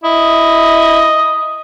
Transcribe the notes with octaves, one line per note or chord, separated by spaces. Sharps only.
E4 D#5